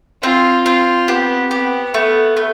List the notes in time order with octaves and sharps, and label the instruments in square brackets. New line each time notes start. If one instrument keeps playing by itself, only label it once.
[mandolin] C4 [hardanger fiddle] F4
[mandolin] C4 [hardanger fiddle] F4
[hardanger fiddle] B3 [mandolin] G4
[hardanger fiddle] B3 [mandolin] G4
[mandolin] A3 [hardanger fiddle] B3
[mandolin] A3